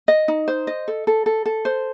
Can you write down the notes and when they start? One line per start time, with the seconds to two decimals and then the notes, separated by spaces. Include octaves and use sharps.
0.08 D#5
0.28 D#4
0.48 C5
0.67 D#5
0.88 A4
1.07 A4
1.26 A4
1.46 A4
1.65 C5